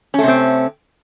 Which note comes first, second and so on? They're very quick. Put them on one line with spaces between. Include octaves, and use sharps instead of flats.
C#4 A3 C3 C4